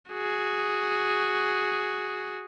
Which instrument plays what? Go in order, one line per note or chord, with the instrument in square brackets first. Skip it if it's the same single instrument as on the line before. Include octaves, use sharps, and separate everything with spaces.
[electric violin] F#4 G#4